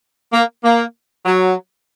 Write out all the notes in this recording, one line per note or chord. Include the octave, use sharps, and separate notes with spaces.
A#3
A#3
F#3